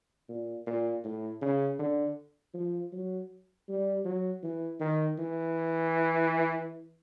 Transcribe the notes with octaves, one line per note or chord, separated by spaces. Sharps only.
A#2
A#2
A2
C#3
D3
F3
F#3
G3
F#3
E3
D#3
E3